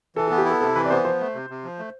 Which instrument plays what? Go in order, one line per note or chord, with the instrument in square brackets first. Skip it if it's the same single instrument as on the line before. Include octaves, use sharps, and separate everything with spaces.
[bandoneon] E3 [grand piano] A4
[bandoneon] B3 [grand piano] A4
[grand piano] G4
[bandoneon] E4 [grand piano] A4
[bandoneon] C3 [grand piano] A4
[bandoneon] E3 [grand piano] B4
[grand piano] D5
[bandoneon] B3 [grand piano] C5
[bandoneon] F3 [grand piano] C5
[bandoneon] A3
C3
C3
F3
A3